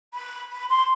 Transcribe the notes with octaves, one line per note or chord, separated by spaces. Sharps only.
B5
B5
C6